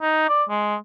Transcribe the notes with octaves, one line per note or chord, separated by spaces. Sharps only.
D#4
D5
G#3